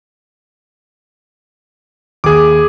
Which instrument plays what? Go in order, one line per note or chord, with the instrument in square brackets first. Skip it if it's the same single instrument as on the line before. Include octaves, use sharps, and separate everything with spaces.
[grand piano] D#2 [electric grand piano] G#4 D6